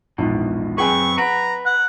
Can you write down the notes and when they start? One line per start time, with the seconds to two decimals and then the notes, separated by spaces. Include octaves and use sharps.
0.18 A#1 E2 G#2 B2
0.78 F#2 C4 G#4 B4 G5 G#5 C#6
1.18 B4 F#5 A#5 D7
1.66 F#5